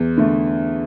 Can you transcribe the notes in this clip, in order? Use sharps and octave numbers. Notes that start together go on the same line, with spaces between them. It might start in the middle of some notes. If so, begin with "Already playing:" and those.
Already playing: E2
D3 A3